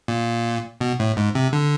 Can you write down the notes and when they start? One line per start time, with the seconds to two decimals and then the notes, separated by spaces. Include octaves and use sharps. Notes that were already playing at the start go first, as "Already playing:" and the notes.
0.08 A#2
0.81 B2
0.99 A2
1.17 G#2
1.35 C3
1.53 D3